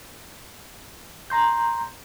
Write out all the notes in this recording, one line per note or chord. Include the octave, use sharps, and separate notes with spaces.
A#5 C6 G6